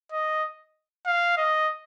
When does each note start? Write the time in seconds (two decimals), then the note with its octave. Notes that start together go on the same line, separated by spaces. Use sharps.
0.12 D#5
1.06 F5
1.37 D#5